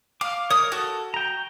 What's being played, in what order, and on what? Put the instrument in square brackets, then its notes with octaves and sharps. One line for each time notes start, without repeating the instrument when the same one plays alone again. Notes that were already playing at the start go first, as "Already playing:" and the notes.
[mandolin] F5 [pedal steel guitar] D6
[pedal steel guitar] A#4 C#5 [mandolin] D#6
[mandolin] F#4 [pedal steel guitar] A4
[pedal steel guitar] G5 A#5